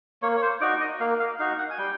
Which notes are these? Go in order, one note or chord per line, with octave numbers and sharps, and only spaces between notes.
A#3 C#5
C#5
C5
D#4 F#4 D5
D#5
A#3 F5
F5
D#4 F#4 F5
F#5
G#5
G3 G5